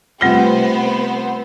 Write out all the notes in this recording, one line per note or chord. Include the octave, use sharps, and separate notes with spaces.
C3 G3 A3 B3 F4 C5 F#5 G7